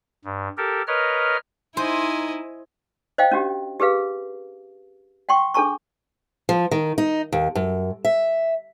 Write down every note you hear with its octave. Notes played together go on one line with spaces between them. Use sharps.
G2
G4 A4 A#4
A#4 B4 C#5 D#5 F6
D#4 E4 C5 D#5 G#5
C5 D#5 F5 G5
C#4 D4 F#4 G4
G4 G#4 B4 F5
F#5 G5 C6 C#6
D4 G#4 A4 G#5 A#5 C#6
F3
D#3
D#4
D#2
F#2
E5